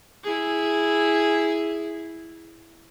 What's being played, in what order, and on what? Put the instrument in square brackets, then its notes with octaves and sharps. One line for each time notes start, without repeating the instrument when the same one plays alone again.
[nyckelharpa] E4 G#4